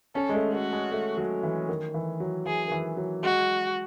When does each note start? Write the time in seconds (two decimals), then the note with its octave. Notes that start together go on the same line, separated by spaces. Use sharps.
0.15 C#4 A4
0.29 G#3
0.34 A3
0.53 A3 F#4
0.73 G#3
0.91 A3
1.17 F#3
1.43 E3
1.69 D#3
1.94 E3
2.20 F#3
2.46 E3 G#4
2.67 D#3
2.72 E3
2.97 F#3
3.23 G#3 F#4